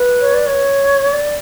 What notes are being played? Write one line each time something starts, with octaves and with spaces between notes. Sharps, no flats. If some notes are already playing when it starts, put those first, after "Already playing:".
Already playing: B4
C#5
D5
C#5
D5